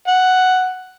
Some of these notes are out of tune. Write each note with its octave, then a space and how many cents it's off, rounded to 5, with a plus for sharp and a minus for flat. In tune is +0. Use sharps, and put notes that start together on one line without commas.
F#5 +5